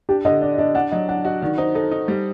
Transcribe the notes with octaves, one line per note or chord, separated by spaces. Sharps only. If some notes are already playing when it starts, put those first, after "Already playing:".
D4 G4
D3 D#5
D4 D5
D4 D#5
D4 F#5
F#3 D#5
D4 F#5
F#4 D#5
D#3 D5
D#4 C5
D#4 A4
D#4
G3